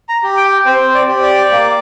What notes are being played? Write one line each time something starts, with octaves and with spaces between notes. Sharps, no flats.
A#5
G4
G5
C4 C5
D5
G4
D5
A#3